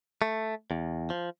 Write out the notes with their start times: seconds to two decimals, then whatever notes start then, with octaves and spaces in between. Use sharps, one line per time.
0.22 A3
0.71 E2
1.10 F3